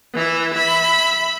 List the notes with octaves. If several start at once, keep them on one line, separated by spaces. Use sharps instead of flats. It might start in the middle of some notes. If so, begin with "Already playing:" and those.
E3 E4
E5 B5